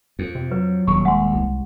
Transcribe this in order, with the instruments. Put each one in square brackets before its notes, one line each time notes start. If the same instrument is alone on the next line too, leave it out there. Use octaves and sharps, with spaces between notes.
[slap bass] F2
[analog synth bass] C3
[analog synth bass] F#3 [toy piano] B4
[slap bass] D#1 [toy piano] C#6
[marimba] G#3 [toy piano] F#5 C6
[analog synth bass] C2